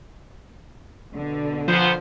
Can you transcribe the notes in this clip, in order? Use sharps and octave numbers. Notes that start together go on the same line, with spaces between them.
B2 D3
A#2 F3 B3 C5